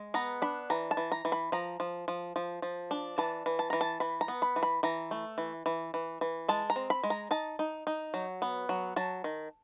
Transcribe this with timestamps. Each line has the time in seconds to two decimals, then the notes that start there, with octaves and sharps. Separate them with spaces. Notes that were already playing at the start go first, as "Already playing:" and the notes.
Already playing: G#3
0.14 B3 A#5
0.42 D4 B5
0.70 E3 A#5
0.91 A5
0.97 E3
1.12 A#5
1.25 E3
1.32 B5
1.52 F3 A#5
1.80 F3
2.08 F3
2.36 F3
2.62 F3
2.91 D4
3.18 E3 A5
3.46 E3
3.59 A5
3.70 E3 A#5
3.81 A5
4.00 E3 B5
4.21 A#5
4.28 B3
4.42 B5
4.56 E3
4.63 B5
4.83 E3 A#5
5.11 A3
5.38 E3
5.66 E3
5.94 E3
6.21 E3
6.48 G#3 A5
6.70 A#5
6.76 C4
6.90 B5
7.04 G#3
7.10 A#5
7.31 D#4 A5
7.59 D#4
7.87 D#4
8.14 F#3
8.42 B3
8.69 F#3
8.96 F#3 A5
9.24 D#3